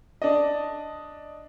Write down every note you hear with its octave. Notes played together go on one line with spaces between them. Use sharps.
D4 D5 D#5